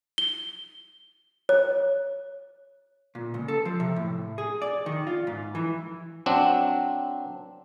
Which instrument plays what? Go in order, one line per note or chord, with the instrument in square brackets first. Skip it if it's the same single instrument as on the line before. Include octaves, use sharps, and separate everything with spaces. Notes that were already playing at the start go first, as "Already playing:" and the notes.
[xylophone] G7
C#5
[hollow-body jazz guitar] A#2
C#2
A4
F3
C3
A2
G#4
D5
D#3
F4
G#2
E3
[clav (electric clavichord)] F#3 C4 D4